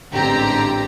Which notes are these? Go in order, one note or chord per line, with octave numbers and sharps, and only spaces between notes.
A1 G#2 D3 C4 G4 A#5